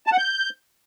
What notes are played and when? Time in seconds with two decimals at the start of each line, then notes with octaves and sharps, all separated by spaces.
0.07 A5
0.12 F#5
0.18 G6